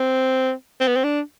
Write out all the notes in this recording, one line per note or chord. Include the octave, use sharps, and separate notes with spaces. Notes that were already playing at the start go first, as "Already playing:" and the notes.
Already playing: C4
C4
B3
C4
D4